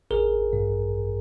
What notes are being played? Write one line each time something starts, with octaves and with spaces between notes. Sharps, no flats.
A1 G#4 A#4
G2